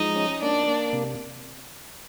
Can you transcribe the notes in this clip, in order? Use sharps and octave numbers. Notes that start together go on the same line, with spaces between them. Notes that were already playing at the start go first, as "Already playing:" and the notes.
Already playing: F3 G#3 D#4 D#5
C#4
A#3 D4 D5
A#3
C3